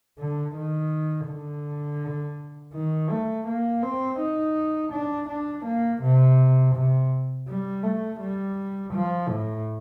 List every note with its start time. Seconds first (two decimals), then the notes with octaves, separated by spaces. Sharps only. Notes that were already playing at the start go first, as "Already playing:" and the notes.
0.19 D3
0.55 D#3
1.27 D3
2.74 D#3
3.10 A3
3.47 A#3
3.82 C4
4.19 D#4
4.92 D4
5.28 D4
5.65 A#3
6.02 C3
6.74 C3
7.47 G3
7.83 A3
8.20 G3
8.93 F3
9.28 A2